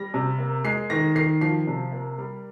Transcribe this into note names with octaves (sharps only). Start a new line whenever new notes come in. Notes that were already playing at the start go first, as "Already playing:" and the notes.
Already playing: G3 A#6
C3
A#3
G#3 C7
D#3 A#6
D#3 C7
F3 C7
C3
A#3
G3